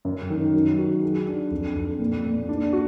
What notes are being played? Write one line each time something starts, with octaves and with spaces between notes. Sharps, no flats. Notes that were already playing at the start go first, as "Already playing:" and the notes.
F#2
D#3
F#3
F#4
G#4
D4
F2
F2
A#2
A#2
D4
F#4